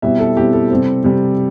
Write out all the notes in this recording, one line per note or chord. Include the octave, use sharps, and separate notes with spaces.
B2 G3 C4 E4 E5
A4
B2 G3 C4 E4 G4
A4
C3 G3 C4
C3 G3 C4